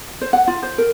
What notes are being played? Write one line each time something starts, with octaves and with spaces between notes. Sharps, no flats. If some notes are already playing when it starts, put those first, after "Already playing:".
C5
F#5
F4
C5
A#4